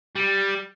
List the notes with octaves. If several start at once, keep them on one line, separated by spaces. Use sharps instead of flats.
G3